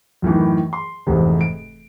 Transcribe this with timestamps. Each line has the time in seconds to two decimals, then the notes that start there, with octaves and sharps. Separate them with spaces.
0.22 F#2 A2 D#3 E3
0.73 C6
1.07 F1 E2 G#2 C3
1.41 D7